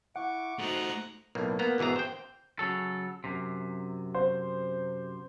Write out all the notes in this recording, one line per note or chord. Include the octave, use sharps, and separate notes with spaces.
E4 F#5 C#6 D6
A3 D#4 F#4 C5 A#5 D#6 F#6
B1 A2 A#3
A#3 B3 A#5
G#1 B2 E3 G#4 A#5
C5 G5
C#3 F#3 A4
F#2 C3
C5